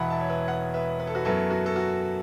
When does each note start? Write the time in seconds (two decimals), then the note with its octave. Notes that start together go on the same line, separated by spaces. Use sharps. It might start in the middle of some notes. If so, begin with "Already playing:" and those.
Already playing: E1 E2 E3 E5 F#5 A5 B5
0.10 E5 A5
0.21 C#5
0.29 B4 E5
0.48 C#5 F#5
0.74 B4 E5
1.00 B4
1.07 A4
1.15 F#4 B4
1.25 F#2 F#3 B3 E4 A4
1.50 F#4
1.66 A4
1.76 F#4